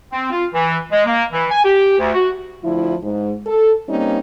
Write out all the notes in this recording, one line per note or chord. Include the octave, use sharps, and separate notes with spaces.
C4
F4
E3
G#3
A#3
E3
G#5
G4
D2
F#4
D2 F3 E4
G#2
A4
G3 A#3 C4 C#4 D#4